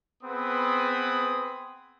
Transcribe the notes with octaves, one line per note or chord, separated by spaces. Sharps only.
B3 C4 G#4 B4 B5 D#6